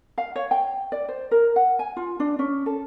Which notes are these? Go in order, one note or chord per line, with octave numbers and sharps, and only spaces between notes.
F5
C#5
G5
D5
C5
A#4
F#5
G#5
F4
D4
C#4
A4